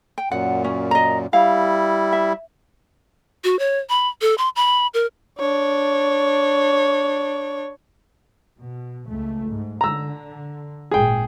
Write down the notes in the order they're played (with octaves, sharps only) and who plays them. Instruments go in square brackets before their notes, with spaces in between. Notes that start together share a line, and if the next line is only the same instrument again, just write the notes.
[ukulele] G5
[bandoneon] F#2 A#2 [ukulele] F#5
[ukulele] C#4
D#5 A#5
[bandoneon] G3 E4 [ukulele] F5
[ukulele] E5
[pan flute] F#4
C#5
B5
A4
C6
B5
A#4
[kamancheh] D4 C#5
[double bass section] B2
C#2 A3
G#2
[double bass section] D3 [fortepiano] A#5 E6
[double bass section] G#1 A#2 [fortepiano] G#4 G5